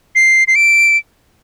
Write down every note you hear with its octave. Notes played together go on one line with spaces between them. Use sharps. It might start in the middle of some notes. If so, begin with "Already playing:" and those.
C7
C7
D7